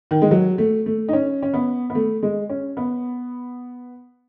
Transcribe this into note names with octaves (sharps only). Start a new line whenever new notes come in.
D#3
G#3
F#3
A3
A3
D#4
C#4
C#4
B3
B3
A3
G#3
C#4
B3